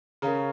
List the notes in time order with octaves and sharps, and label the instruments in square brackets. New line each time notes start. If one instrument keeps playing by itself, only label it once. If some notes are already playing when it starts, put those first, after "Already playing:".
[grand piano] C#3 C#4 [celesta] A#4 F5 A#5